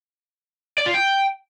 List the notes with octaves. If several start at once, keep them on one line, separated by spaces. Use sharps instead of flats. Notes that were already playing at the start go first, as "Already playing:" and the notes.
D5
F4
G5